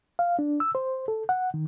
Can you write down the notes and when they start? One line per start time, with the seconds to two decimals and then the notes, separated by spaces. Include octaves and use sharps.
0.19 F5
0.39 D4
0.60 E6
0.75 C5
1.08 A4
1.29 F#5
1.54 D#3